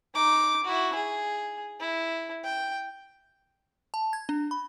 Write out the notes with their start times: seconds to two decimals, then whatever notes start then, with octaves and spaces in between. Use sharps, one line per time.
0.14 D#4 D6
0.64 E4 F#4
0.95 G#4
1.80 E4
2.44 G5
3.94 A5
4.13 G#6
4.29 D4
4.51 B5